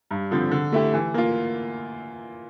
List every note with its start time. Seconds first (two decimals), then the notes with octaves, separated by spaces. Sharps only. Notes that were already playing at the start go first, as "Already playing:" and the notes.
0.11 G2
0.31 D3 F3 C4
0.51 D3
0.72 A3 E4 G4
0.94 E3
1.14 A#3 F4